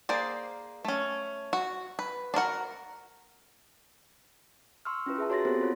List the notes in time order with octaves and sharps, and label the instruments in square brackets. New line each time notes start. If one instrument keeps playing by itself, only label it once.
[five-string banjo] A#3 G#4 C5 D5
A3 C#4
F#4
B4
D4 F#4 A#4 F#5
[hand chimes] C6 C#6 E6 F6
C#4 E4 F4 B4
G#4 E5 A5
F#4 C#5 C6 A6 A#6
B3 C4 F4 G4 A4 C5
F4 C#5